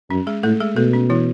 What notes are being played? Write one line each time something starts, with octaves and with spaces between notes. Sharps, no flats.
F#2 C#4
G#3 G#4
A2 A3 A4
G#3 G#4
B2 A3 A4
C#4
E3 E4